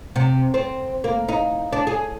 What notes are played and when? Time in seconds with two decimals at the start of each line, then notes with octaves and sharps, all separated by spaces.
0.16 C3
0.54 C4
1.04 A#3
1.28 D#4
1.73 D4
1.87 G#4